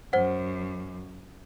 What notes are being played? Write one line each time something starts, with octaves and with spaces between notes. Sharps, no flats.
F#2 C5 F#5